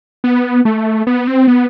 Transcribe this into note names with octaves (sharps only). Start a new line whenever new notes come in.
B3
A3
B3
C4
B3